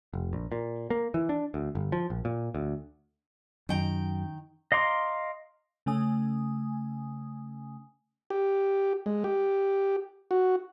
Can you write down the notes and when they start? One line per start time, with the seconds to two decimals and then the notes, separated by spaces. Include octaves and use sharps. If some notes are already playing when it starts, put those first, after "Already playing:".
0.13 F1
0.33 A#1
0.52 A#2
0.90 A#3
1.14 E3
1.29 D4
1.54 D2
1.75 G1
1.92 F3
2.10 A#1
2.25 A#2
2.55 D2
3.69 F#2 D#3 G5 A#5
4.72 D#5 F5 A#5 C6 D6
5.86 C#3 A3 C#4 G#5 D#6
8.30 G4
9.06 G#3
9.24 G4
10.31 F#4